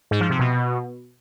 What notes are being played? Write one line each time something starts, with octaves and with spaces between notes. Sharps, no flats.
G#2
F3
C3
B2